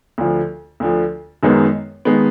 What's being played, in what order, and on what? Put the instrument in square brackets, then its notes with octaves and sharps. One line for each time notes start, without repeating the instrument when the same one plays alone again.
[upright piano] D2 D3 F3
D2 D3 F3
F#2 D#3 G#3 B3
D#3 G#3 B3